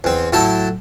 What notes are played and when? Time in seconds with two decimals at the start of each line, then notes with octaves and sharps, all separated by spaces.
0.04 E2 C4
0.32 A2 F#3 E4 A4 G5 A5